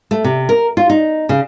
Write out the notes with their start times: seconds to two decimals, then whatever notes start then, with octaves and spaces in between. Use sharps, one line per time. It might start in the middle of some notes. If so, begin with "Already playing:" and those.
0.11 A3
0.24 C3
0.49 A#4
0.77 F4
0.90 D#4
1.29 C#3